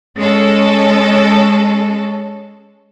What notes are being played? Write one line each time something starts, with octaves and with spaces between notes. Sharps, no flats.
G#3 C#4 A4